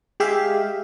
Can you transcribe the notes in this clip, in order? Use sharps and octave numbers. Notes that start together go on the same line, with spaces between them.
G#3 G4 G#4 E5 F5